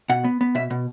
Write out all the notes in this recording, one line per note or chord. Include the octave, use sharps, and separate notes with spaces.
B2 F#5
B3
B3
B2 E5
B2